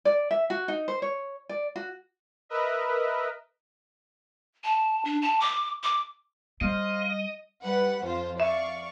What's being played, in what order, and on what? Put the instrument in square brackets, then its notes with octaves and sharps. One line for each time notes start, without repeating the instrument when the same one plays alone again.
[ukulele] D5
E5
F#4
D#4
C5
C#5
D5
F#4
[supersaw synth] A#4 B4 D#5 E5
[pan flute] A5
D4
A5
D6
D6
[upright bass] G3 [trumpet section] C5 F5 [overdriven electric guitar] D#5
[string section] G3 B4 F#5
F2 F4 C5
[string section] D5 F5 C#6 [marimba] E5